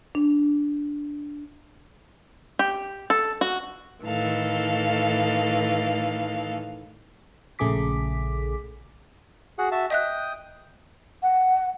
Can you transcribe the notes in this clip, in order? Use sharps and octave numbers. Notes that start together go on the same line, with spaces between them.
D4
G4
A4
F#4
A2 D#3 E3 A4 F5
A#1 C#3 A3 G#4 D6 B6
F#4 G#4 F#5
F#4 E5 A5
D#5 E5 G5 D#6 F#6
F#5